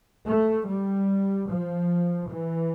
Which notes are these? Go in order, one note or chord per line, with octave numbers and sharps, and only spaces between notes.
A3
G3
F3
E3